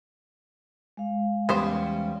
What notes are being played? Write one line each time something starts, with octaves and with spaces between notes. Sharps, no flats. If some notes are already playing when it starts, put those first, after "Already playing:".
G#3 F5
E2 G3 B3 C#4 G4 C5